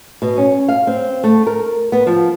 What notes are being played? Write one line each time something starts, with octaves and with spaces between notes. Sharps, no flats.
B2
C#4
F5
C4
A3
A#4
B3
F3